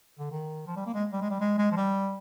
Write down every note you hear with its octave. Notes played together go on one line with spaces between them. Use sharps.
D3
D#3
F3
G3
A#3
G#3
G3
G#3
G3
G#3
G#3
F3
G3